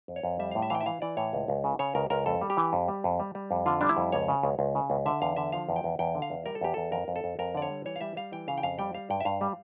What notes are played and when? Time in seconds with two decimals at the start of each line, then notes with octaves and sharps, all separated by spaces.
0.08 F2
0.16 C#5
0.23 F2
0.39 G3 E5
0.51 A2 F5
0.62 E5
0.70 E3 F5 G5
0.81 E5
0.86 E3 F5
1.02 E3 D5
1.17 A2 C#5
1.33 C#2
1.48 C#2
1.64 C#3
1.79 C#3 C#5
1.95 C#2 A#4
2.10 C#2 A#4
2.26 F2 A4
2.41 G3
2.50 G4
2.57 E3
2.73 F2
2.88 G3
3.04 F2
3.20 G3
3.35 G3
3.51 F2
3.66 D3 F4
3.81 G3 D4
3.89 E4
3.97 F2
4.12 C#2 C#5
4.28 C#3
4.43 C#2
4.59 C#2
4.75 C#3
4.90 C#2
5.06 D3 E5
5.22 E2 F5
5.36 D3 E5
5.52 F3 F5
5.69 E2
5.76 G5
5.84 E2
5.99 E2 G5
6.15 D3
6.22 F5
6.30 E2
6.46 G3 A#4
6.55 A4
6.61 E2 G4
6.74 E2 A4
6.92 F2 A#4
7.08 F2
7.16 A4
7.24 F2
7.39 F2 A#4
7.55 D3 D5
7.62 C#5
7.70 G3
7.86 E3 C#5
7.96 F5
8.01 G3 E5
8.17 G3 F5
8.32 E3 G5
8.48 C#3 F5
8.58 G5
8.63 F2 F5
8.79 G3 G5
8.94 G3 F5
9.10 G2 G5
9.21 E5
9.25 G2 F5
9.41 G3